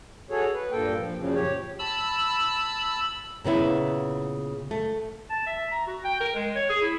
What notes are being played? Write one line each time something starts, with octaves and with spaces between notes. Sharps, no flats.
F#4 G#4 A4 C#5
B4
G2 A#2 A#3 A4 G5
F3
F#2 A#2 C#3 F3
G4 C#5
A5 B5 E6
A#2 C#3 B3 E4
A3
A5
E5
A#5
F#4
G5
A#4
G#3
C#5
G#4
E4